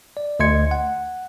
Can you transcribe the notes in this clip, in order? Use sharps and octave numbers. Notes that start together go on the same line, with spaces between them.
D5
D2 D#5 C6 G#6 C#7
F#5